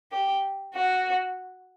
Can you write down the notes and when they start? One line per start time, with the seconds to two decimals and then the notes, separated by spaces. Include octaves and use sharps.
0.12 G4
0.74 F#4